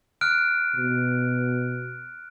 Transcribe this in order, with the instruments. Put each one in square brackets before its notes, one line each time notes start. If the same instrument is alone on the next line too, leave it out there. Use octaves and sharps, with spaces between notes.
[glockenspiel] F6 F#6 D7
[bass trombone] B2